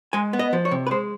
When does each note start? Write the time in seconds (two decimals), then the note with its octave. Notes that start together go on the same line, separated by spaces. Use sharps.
0.13 G#3 G#5
0.33 B3
0.39 D#5
0.53 F3
0.65 C#5
0.71 C3
0.87 B4
0.91 G#3 C5